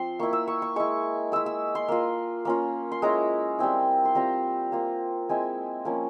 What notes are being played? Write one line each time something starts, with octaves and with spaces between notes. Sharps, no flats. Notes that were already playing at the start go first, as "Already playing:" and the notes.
Already playing: F3 C4 C6
A#3 E4 C#6
E6
C#6
C#6
G#3 E4 C#6
G#3 E4 E6
E6
C6
A#3 F4
A#3 C#4 F4
C6
G#3 C#4 E4 A#5
G3 C4 E4
C6
G3 C4 F4 A#5
A#3 F4
G#3 C4 E4 G#5
F3 A#3 C#4